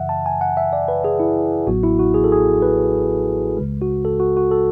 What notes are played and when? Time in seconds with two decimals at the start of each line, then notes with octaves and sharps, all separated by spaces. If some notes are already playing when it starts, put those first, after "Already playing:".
Already playing: F#2 C#3 E3 E5 F#5
0.09 A5
0.26 G#5
0.41 F#5
0.57 E5
0.73 D5
0.88 B4
1.04 G#4
1.20 E4
1.67 A1 A2 F#3 B3 F#4
1.83 E4
1.99 F#4
2.14 G#4
2.24 A4
2.32 G#4
2.62 B4
3.57 C#2 C#3 G#3
3.82 F#4
4.05 A4
4.20 F#4
4.37 F#4
4.51 A4